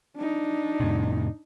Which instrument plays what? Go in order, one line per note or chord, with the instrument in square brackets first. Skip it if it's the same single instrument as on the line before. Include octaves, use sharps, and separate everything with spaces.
[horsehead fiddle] D4 D#4
[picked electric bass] F2 A2 C3